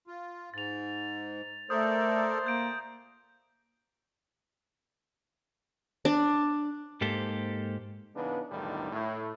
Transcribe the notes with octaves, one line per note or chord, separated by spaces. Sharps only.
F4
G#2 A6 F7
A3 A4 A#4 C5 D5 D#6
A#2 A#3 G6 D7
D4
G#2 A#3 G4 A4 C5
C#3 E3 B3 D4 D#4 B4
B1 E2 A2 D3 D#3 G3
A2